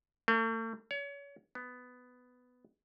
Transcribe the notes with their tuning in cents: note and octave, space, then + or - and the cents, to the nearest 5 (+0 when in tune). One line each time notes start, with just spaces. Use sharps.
A3 +45
C#5 +30
B3 +10